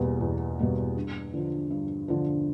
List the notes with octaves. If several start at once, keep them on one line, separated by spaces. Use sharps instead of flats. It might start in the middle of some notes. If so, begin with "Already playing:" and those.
Already playing: E2 B2 G3 A#3
E2
B2 G3 A#3
G2
D3 F3
G2
D3 F3